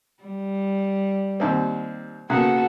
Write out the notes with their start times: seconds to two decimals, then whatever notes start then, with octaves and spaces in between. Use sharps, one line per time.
0.24 G3
1.40 D#2 C4
2.30 C#3 A#3 B3 F#4 A4 F#5